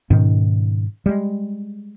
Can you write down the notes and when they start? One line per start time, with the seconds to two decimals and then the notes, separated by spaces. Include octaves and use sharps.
0.10 G#2 B2 D#3 C#4
1.06 G3 G#3